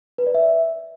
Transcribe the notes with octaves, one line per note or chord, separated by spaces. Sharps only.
B4
D5
E5